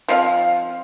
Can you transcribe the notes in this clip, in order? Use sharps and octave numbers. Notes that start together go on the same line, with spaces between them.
F3 C4 F5